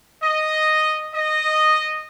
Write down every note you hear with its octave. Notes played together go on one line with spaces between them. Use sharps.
D#5
D#5